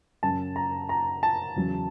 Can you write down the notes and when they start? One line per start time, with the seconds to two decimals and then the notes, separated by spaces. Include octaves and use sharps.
0.23 F#2 C#3 F#3 A5
0.56 A#5
0.89 A#5
1.23 A5
1.56 E2 C#3 F#3